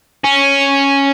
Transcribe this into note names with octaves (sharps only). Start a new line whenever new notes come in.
C#4